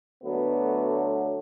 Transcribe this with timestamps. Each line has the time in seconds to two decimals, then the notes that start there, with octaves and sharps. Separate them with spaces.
0.23 D2 D3 F#3 A3 B3